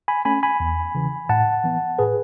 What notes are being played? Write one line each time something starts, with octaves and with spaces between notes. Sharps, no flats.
G#5 B5
A3 C#4 G#5 B5
G#5 B5
E2
C#3 E3
A2 F#5 A5
E3 B3
A2 G#4 B4